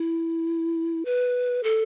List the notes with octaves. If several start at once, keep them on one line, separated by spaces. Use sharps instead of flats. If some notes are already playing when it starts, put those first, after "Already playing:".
Already playing: E4
B4
A4